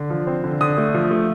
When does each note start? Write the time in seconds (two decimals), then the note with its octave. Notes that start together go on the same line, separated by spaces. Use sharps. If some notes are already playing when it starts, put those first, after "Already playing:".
Already playing: D3
0.10 F3
0.27 C4
0.44 D3
0.61 D3 D#6
0.78 A3
0.94 F3
1.11 A3